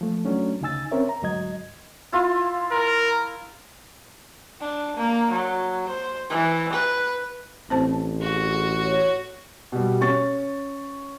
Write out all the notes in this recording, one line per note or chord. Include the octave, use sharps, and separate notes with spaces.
F3 A3
F#3 A3 C#4 D4
D2 C#3 D#4 G#5 E6 A6
C4 C#4 A#4 C#5 E5
A#5
D2 G#2 F#3 D#5 G#6
E4 F4 C6
A#4
D4
A#3
F#3
C5
E3
B4
A1 C4 C5 A5
F#4 G#4
C#5
B2 G3
C#4 C#6 A6